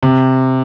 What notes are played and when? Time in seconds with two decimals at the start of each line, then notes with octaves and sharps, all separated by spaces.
0.03 C3